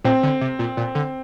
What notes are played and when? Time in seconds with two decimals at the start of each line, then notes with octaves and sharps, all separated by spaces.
0.04 A#2 C4
0.23 D3
0.41 C3
0.59 A#2
0.77 A#2
0.95 D3